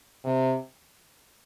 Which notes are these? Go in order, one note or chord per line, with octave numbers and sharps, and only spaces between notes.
C3